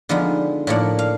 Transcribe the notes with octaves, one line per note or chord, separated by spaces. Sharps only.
D3 F3 G#3 B3 D#4
A2 F3 A#3 D4 F#5
F5